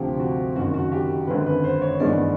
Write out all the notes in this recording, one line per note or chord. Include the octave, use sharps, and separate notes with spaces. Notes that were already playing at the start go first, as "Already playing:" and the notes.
Already playing: D2 C3 F3 G4
F#4
F#1 F#2 D#3 F#4
F#4
G4
G#1 F#2 D3 B4
B4
C5
C#5
A1 G2 D#3 G#3 B3 D5